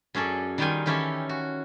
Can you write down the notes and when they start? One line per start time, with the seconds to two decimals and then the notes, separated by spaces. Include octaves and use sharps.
0.14 F#2 C#4 G#4 A4 D5
0.58 D#3 G3 D#4 F4 G5 G#5
0.86 D#3 E3 C#4 E4 G4 A4
1.29 F#4